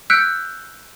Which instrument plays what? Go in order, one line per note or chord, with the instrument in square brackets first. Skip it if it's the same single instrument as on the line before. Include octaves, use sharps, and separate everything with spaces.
[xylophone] E6 F#6 G6 B6 C#7 D7